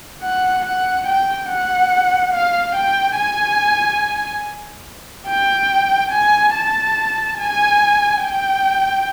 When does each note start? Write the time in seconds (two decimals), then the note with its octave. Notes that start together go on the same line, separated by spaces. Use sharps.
0.23 F#5
0.65 F#5
1.07 G5
1.50 F#5
2.34 F5
2.75 G5
3.18 G#5
5.28 G5
6.12 G#5
6.55 A5
7.39 G#5
8.23 G5